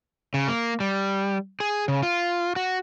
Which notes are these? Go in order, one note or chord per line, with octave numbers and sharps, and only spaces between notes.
C#3
A#3
G3
G#4
C#3
F4
F#4